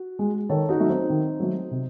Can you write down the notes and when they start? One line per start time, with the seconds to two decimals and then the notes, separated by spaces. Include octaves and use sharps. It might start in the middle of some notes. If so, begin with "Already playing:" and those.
Already playing: F#4
0.19 G#3
0.49 D#3 A4 C#5
0.69 D#4 F#4
0.79 F#3 A3
0.90 C4 D#4
1.10 D#3
1.40 F#3 A3
1.71 C3